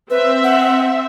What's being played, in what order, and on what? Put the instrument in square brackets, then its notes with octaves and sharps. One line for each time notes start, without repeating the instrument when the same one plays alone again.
[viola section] C4 E5 [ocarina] B4
[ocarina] F#5